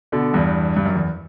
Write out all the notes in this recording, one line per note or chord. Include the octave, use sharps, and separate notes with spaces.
B2 D3
E2 G2
G2
F#2
E2